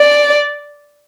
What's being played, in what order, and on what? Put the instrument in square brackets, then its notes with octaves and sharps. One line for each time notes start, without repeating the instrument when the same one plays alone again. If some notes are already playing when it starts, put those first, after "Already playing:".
Already playing: [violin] D5